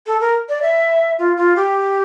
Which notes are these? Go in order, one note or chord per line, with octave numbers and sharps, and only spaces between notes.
A4
A#4
D5
E5
F4
F4
G4